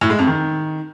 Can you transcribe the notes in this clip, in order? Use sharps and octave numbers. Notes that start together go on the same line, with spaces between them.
A2
G#3
F2
D#3